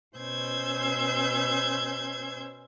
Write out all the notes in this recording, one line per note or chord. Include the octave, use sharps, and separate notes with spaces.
B2 C#4 C5 E6 G6 G#6